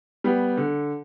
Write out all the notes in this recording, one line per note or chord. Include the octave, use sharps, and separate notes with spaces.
G3 B3
D3